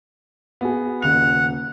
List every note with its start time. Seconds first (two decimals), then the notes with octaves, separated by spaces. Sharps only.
0.61 B3 F#4 G#4
1.02 D#1 C#3 F#5 F7